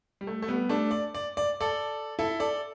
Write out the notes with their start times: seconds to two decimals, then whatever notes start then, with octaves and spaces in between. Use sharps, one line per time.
0.21 G3
0.27 A3
0.42 A3
0.48 G3 B3
0.69 A3 D4
0.91 D5
1.15 D5
1.37 D5
1.61 A4 D5
2.19 E4 A4
2.40 A4 D5